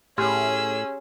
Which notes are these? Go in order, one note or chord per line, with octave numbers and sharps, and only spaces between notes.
A2 C#4 G4 G#4 C6 E6 F6